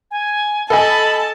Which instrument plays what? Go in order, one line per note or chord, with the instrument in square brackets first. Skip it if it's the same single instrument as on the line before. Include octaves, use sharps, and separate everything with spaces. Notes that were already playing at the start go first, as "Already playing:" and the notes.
[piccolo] G#5
[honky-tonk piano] A4 D#5 G#5 [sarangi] A5 [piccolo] B5